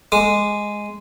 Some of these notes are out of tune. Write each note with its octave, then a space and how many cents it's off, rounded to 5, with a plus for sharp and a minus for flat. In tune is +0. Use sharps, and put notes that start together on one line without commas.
G#3 +0 D6 +20